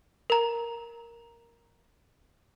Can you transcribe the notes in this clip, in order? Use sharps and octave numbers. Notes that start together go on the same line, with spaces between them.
A#4 A#5